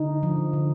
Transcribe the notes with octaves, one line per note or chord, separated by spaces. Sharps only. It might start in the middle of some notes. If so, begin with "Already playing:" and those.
Already playing: D3 D#4
F3
D3